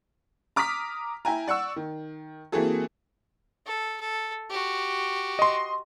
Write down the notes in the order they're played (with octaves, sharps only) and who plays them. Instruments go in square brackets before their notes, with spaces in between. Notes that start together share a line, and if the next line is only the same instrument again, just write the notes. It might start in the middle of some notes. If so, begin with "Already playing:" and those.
[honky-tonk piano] A#5 D6 D#6 F6 B6
E4 G5 G#5 A#5
D5 F#5 C#6 E6
D#3
E3 A#3 C4 F#4 G#4 A4
[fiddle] A4
A4
F#4 G4
[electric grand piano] D#5 C6